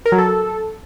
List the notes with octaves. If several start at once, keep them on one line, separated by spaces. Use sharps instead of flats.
A#4
F#3
A4